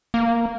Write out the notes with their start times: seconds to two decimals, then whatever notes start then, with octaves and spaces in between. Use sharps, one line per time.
0.14 A#3